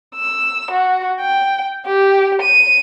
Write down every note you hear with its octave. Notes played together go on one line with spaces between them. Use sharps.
E6
F#4
G5
G4
D#7